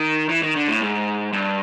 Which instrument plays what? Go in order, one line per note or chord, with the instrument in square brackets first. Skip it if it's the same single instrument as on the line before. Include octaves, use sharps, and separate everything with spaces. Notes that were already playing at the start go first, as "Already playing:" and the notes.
Already playing: [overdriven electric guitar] D#3
E3
D#3
D3
A2
G#2
G2